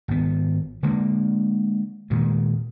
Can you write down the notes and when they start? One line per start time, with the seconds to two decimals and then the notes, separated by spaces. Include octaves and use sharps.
0.08 G#1 B3
0.83 D3 G#3 A#3
2.10 A#2 D#3 G#3